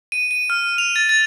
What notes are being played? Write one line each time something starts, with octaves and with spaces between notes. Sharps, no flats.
D#7
D#7
F6
F7
A6
A6